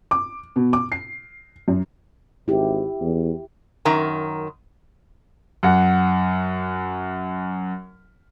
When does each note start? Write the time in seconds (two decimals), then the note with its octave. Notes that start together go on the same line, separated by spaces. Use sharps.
0.11 D6
0.56 B2
0.73 D6
0.92 C7
1.68 F#2
2.48 G#1 E4 G4
3.01 E2
3.85 F#2 D#3 A#5
5.63 F#2 F#5